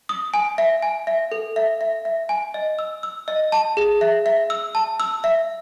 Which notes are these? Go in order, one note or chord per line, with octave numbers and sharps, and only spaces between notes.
D#6
G#5
E5
G#5
E5
A4
E5
E5
E5
G#5
D#5
E6
E6
D#5
A5
G#4
E5
E5
E6
A5
E6
E5